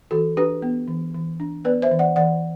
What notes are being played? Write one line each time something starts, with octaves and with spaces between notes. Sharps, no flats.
E3 F#4 A4
D4 G4 B4
B3
E3
E3
D4
B3 B4 D5
C5 E5
E3
D5 F#5
E3 D5 F#5